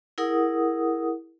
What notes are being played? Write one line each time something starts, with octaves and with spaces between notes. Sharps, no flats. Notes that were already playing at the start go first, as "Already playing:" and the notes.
E4 G#4 A#4 F#5 D#6